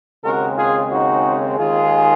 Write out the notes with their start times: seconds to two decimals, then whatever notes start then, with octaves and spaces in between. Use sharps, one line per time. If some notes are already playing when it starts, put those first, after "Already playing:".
0.24 D#2 C#3 G#3 C4 F#4 A#4
0.57 F4 G#4
0.90 D#4 F#4
1.57 D#2 D#3 G#3 F4 G#4